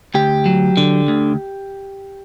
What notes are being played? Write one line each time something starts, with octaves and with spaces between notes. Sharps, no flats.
D2 G4
F#3
D3
D2